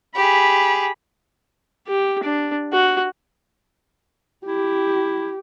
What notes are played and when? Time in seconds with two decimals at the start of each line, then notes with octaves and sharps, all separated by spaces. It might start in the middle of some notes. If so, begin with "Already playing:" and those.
0.16 G4 G#4 B5
1.87 G4
2.23 D4
2.73 F#4
4.45 E4 G4